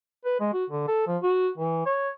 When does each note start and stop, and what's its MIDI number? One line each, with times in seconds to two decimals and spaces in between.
0.25 0.35 71
0.40 0.49 56
0.53 0.65 66
0.70 0.87 50
0.88 1.04 69
1.07 1.18 53
1.23 1.49 66
1.58 1.84 52
1.86 2.10 73